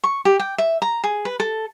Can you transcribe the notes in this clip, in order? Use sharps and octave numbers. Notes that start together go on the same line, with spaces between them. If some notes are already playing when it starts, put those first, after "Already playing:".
C#6
G4
G5
E5
A#5
G#4
B4
A4